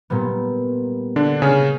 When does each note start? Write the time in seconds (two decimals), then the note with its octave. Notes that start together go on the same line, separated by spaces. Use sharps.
0.10 A#2 G3 B3
1.16 D3 D4
1.42 C#3 C#4